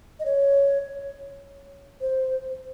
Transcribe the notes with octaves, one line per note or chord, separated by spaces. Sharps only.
D#5
C#5
C5